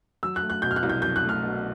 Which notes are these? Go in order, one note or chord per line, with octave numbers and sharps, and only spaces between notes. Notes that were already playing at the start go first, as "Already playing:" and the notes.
F#3 E6
F#6
A3
F#6
B2 G6
F6
F#6
C2
G6
F#3 G6
F#6
A3
F6
B2